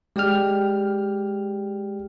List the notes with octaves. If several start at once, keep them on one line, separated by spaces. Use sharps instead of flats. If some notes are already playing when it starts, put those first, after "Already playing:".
G#3 G4 D5 G5 F6